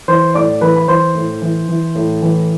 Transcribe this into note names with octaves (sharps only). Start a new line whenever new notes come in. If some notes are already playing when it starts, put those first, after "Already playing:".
E3 C5 C6
A2 D5 D6
E3 B4 B5
B5
E3 C5 C6
A2
E3
E3
A2
E3